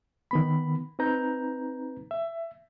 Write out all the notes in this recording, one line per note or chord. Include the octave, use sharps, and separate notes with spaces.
D#3 B3 B5
C4 D#4 B4 A#5 G6
E5